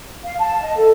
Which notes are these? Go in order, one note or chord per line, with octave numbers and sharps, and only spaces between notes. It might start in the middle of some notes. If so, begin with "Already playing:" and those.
F5
A5
D#5
A4